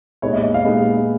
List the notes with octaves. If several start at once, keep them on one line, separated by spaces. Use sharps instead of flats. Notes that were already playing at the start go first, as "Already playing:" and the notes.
A#2 G#3 B3 D#4 C#5
D#5
D#5
F5
A#2 G#3 B3 D#4